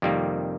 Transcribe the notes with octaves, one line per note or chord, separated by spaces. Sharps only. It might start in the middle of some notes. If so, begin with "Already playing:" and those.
F2 C3 D#3 G3 A#3